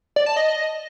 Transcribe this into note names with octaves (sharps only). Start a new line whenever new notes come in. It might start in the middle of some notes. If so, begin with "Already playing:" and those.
D5
A5
D#5